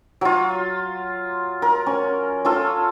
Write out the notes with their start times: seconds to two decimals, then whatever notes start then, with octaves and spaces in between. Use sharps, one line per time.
0.21 F#3 F4
1.62 A#4
1.86 C#4
2.45 C#4 F4 A4